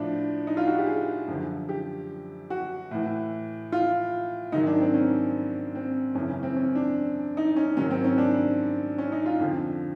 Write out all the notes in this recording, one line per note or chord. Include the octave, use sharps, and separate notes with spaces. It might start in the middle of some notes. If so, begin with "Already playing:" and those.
Already playing: A2 F3 D4
D#4
F4
F#4
G4
G#4
F#2 D3 F3
G4
F#4
A2 E3
F4
G#2 D#3 F#3 D#4
D4
C4
C#4
C4
F#2 C#3 E3 C#4
C#4
C4
C#4
D4
D#4
C#4
G#2 D#3 F#3 C#4
C4
C#4
D4
C#4
D#4
F4
F2 D3 F3